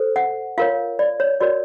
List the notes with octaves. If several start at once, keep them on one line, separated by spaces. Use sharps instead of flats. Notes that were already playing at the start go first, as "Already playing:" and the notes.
Already playing: A4 C5
F#5
F4 A#4 C#5 F5
D5
C#5
F#4 A#4 C#5 D5